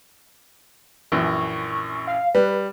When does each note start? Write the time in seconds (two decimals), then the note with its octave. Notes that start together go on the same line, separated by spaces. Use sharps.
1.12 A#1 F#2 E3 C#6
2.07 F5
2.35 G3 B4